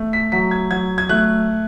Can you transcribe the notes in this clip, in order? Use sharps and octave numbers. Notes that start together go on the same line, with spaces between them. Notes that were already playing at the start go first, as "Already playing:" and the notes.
Already playing: A3
B6
F#3 B6
G#6
F#3 G#6
G#6
A3 F#6